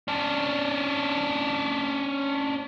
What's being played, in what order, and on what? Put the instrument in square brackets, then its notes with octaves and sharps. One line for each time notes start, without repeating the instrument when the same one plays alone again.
[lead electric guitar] C#4 D4